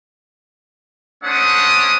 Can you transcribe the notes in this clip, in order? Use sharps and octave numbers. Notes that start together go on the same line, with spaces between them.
A3 C#4 D4 C5 F#5 D#6